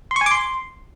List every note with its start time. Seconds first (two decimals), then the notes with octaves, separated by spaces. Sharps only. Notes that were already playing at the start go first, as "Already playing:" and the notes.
0.11 C6
0.16 C#6
0.21 G#5
0.26 D6
0.31 C6